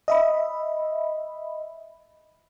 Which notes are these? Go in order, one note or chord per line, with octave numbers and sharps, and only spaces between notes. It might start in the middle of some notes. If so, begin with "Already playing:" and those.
D#5 E5 B5